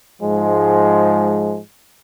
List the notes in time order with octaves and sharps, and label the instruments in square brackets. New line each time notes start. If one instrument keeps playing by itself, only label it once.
[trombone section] G#2 F3 G#3